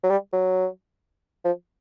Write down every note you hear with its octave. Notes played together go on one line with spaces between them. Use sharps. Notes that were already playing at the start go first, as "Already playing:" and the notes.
F#3
G3
F#3
F3